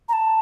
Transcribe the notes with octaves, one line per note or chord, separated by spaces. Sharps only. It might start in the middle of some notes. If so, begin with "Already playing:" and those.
A#5
A5